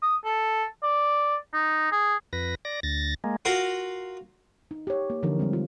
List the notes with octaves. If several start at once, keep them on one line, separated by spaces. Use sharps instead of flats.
D#6
A4
D5
D#4
G#4
F2 B4 A#6
D5 A#6
D2 A6 A#6
G#3 A#3
F4 F#4 A#4 F5 F#5
D#4
G4 C#5
A#3
D3 E3 F3 D#4 G4 A#4
G3 G#3 C4
F4